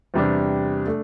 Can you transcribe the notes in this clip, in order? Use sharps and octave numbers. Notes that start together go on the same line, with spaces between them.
E2 C3 G3 D4
A3 D4